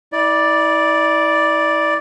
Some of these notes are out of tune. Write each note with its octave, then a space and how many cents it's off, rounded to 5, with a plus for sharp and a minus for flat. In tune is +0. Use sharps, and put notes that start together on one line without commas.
E4 -35 D5 +0